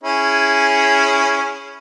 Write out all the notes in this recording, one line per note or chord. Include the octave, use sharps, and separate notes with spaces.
C#4 E4 G#4